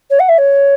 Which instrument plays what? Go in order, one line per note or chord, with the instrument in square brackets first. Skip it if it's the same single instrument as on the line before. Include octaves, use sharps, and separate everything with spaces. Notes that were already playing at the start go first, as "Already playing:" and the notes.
[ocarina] C#5
F#5
E5
C#5